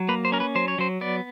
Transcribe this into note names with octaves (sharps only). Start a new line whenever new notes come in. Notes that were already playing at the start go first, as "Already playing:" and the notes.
Already playing: F#3
A#3 B4
C5
C#4 A#4
B4
F#3 C5
C#5
F#3 C5
B3 D5